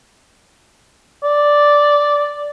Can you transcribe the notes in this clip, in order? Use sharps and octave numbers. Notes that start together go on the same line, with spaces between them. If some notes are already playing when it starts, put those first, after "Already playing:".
D5